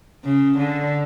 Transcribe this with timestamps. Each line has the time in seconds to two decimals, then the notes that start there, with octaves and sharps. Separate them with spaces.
0.24 C#3
0.58 D3